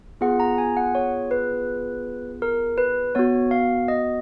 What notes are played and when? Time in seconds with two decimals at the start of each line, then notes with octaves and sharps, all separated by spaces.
0.21 B3 F4 G#4 F#5
0.40 A#5
0.58 G#5
0.77 F#5
0.95 C#5
1.31 B4
2.42 A#4
2.78 B4
3.15 B3 F#4 C#5
3.51 F5
3.88 D#5